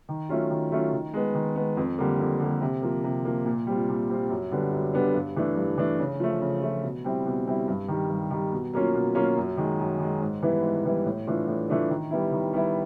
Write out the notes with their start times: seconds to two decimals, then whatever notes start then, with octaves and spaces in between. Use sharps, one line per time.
0.09 D#3
0.29 F#3 A3 C#4 F4
0.50 D#3
0.72 F#3 A3 C#4 F4
0.93 D#3
1.14 G#3 B3
1.35 D#3
1.56 G#3 B3
1.77 F2
1.99 D3 G3 A#3
2.20 F2
2.40 D3 G3 A#3
2.61 C3
2.82 F3 A#3
3.04 C3
3.25 F3 A#3
3.46 A#2
3.67 G3 C4 F4
3.89 A#2
4.09 G3 C4 F4
4.30 F#2
4.52 D3 G3 B3 D4
4.72 F#2
4.93 D3 G3 B3 D4
5.14 G2
5.36 E3 A3 D4
5.57 G2
5.77 E3 A3 D4
5.99 C#3
6.20 F3 A3
6.41 C#3
6.62 F3 A3
6.83 B2
7.04 G3 C4 E4
7.26 B2
7.47 G3 C4 E4
7.68 G2
7.88 D#3 G3
8.09 G2
8.31 D#3 G3
8.52 B2
8.73 F#3 A#3 C#4 F4
8.95 B2
9.15 F#3 A#3 C#4 F4
9.37 F#2
9.57 D#3 G#3
9.79 F#2
9.99 D#3 G#3
10.21 G#2
10.42 E3 G3 B3 E4
10.63 G#2
10.85 E3 G3 B3 E4
11.05 A2
11.27 E3 A3 D4 F4
11.48 A2
11.69 E3 A3 D4 F4
11.90 D#3
12.11 G3 B3 E4
12.32 D#3
12.53 G3 B3 E4